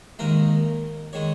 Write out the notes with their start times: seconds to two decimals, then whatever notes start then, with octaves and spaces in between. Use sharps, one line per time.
0.19 D#2 D#3 G#3 A#4
1.13 D#3 G#3 C#5